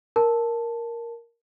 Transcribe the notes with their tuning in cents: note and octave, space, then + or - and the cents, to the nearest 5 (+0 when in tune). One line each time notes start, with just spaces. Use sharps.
A#4 +0 A5 +0